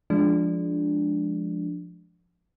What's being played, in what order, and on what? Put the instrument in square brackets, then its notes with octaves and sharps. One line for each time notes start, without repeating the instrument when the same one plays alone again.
[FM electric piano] F3 G#3 D4